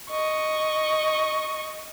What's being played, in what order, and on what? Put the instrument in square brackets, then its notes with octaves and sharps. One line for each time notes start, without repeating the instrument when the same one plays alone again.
[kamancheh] D#5 C#6